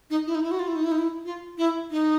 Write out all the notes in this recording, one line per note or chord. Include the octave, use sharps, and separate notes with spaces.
D#4
E4
D#4
E4
F#4
F4
E4
D#4
E4
D#4
E4
F4
E4
D#4